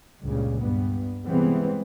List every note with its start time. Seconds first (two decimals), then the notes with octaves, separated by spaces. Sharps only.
0.25 C#2 G2 A#2 C#3
0.59 G2 B3
1.26 C3 E3 G3 G#3 B3 C4